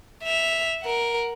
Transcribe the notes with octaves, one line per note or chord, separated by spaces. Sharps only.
E5 F7
A#4 F#5